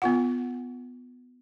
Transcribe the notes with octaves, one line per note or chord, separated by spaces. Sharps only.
B3 F4 F#5